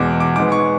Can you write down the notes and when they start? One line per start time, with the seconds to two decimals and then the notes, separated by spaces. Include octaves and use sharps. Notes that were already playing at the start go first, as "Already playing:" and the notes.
Already playing: E2 B2 G#3 B3 D6
0.20 D6
0.36 G#2 G#3 B3 D6
0.52 C#6